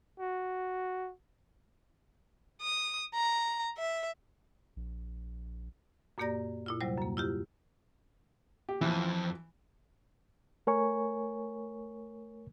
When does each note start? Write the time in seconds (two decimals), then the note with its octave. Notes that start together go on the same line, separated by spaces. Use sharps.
0.20 F#4
2.61 D#6
3.14 A#5
3.77 E5
4.76 A#1
6.18 F#2 A#2 A#3 G4 D5 A#6
6.66 A#2 E4 F4
6.81 D#2 C3 F#3 G3 C5
6.98 F#2 A#3
7.17 E4 F4 G4
8.69 G4
8.81 F2 E3
10.67 A3 A#4 C#5 G#5 C#6